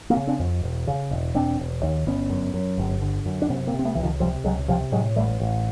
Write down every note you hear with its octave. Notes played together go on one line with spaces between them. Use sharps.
A#3 C4
C#3
C4 D4
F2
E1
C#3
E1
E1 C4 D4
E1
D#2
G1 B3 C#4
F#2
F#2
G1
D3
F#2
D4
C3 B3 C#4
A#3 C4
C3
C4
A3 B3
C#2 E3
D#3 F3
C3 F3 G3
C#2 F#3 G#3
C3 F3 G3
A2 F#3 G#3
A1 G3 A3
A1